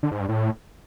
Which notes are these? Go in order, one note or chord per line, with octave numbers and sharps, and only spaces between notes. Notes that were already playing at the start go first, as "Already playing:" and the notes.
D3
G#2
G2
A2